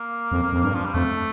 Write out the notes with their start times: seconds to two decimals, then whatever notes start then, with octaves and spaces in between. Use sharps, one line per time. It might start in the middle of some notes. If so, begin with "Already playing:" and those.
Already playing: A#3
0.32 F2
0.53 F2
0.63 G2
0.74 F3
0.85 G3
0.94 F2 A3